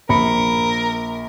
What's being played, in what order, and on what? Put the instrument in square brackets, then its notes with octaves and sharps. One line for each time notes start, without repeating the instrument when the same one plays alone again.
[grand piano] A#1 B5 C#7 [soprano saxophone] A#4